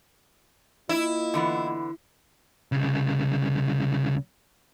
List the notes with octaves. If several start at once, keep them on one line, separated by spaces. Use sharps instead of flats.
A#3 E4 F4 D#5
D3 E3 B3
C2 C#3